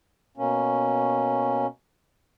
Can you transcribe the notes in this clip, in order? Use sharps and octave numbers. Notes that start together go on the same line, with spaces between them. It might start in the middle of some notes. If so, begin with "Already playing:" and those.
B2 A#3 C#4